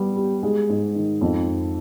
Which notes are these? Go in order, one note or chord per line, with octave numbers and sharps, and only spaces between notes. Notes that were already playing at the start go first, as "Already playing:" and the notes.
Already playing: G3 B3
G4
G#3
G#2
D#3
F2